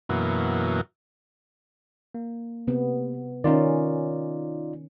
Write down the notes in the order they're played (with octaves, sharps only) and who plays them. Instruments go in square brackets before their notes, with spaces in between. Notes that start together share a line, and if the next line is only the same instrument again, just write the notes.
[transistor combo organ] F#2 B2 E3 A#3
[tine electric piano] A#3
[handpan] C3 B3
[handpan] D#3 C#4 [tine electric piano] D#4 F4 D5